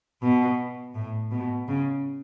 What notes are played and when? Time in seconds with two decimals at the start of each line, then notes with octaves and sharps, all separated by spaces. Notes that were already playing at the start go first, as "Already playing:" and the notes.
0.22 B2
0.95 A2
1.31 B2
1.68 C#3